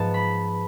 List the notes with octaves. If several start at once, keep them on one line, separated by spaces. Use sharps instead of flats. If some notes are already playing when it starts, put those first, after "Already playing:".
Already playing: G#2 F3 B3 A5
B5